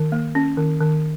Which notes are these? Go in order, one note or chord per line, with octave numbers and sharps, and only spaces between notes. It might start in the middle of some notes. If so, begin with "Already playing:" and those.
Already playing: D#3
A#3
C#4
D#3
D#3